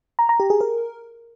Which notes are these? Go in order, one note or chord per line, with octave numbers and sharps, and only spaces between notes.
A#5
A#5
G4
G#4
A#4